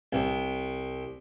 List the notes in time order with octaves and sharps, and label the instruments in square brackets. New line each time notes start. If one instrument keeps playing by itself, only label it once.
[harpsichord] C2